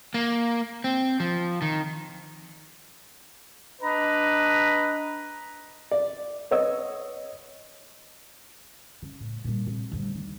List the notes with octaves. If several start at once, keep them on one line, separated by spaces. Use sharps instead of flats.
A#3
C4
F3
D#3
D4 B4 D#5 A#5
D5
B4 C#5 D#5 E6
C#3
A2
G2 A#2
C3
D2 G2
D#3